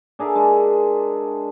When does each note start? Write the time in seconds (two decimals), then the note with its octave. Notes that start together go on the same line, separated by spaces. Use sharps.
0.19 D4 G#4 A#4 E5
0.35 G#3 D4